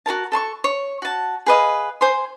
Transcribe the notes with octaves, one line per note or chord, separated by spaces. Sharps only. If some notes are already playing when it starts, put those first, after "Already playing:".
F#4 A4 A#4 A5
A4 A5 C6 C#6
C#5
F#4 A5
G#4 B4 D#5 F5
C5 G#5 C6